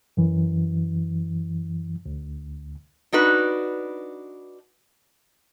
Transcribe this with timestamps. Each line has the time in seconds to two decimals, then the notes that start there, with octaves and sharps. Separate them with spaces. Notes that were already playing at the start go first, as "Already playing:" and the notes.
0.17 F#2 E3
2.06 D2
3.13 D4 D#4 F#4 B4